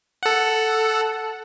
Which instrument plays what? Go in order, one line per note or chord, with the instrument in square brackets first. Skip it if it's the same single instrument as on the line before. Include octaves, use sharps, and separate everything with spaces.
[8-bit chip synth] A4 F#5